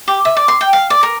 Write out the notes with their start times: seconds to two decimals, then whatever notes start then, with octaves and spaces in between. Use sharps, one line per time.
0.08 G4
0.25 E5
0.37 D5
0.48 C6
0.61 G5
0.73 F5
0.90 D5
1.03 A#4